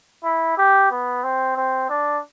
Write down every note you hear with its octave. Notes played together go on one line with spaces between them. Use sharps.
E4
G4
B3
C4
C4
D4